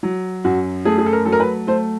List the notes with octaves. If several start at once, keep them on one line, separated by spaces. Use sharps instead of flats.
F#3
F#2 F#4
A3 G#4
G#4
A4
A#4
F#3 A4
A#4
B4
A3 C5